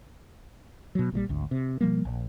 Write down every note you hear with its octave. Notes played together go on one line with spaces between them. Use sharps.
B2 F#3
A#1 A#2 E3 G3
G#1 D2
C3
B2 F3 G3 A#3
A#1